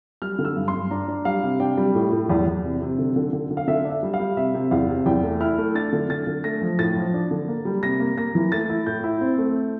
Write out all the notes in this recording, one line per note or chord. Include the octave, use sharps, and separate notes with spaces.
G3 F6
D3
E6
G2
C6
G2
D4 A#5
D4
G3 F5
C3
D4 G5
G3
A2
A2
E2
E2
C3
C3
D3
D3
D3
D3
F5
D3 E5
D4
E5
G3
F5
G3
C3 E5
C3
E2 F5
C3
E2 G5
A3
E4 F6
A3
D4 A6
D3
D3 A6
D3
A3 A#6
F3
A2 A6
F3
D4
D3
A#3
G3
C3 A#6
A#3
A#3 A#6
E3
A3 A6
E4
A2 G6
E4
C4
A3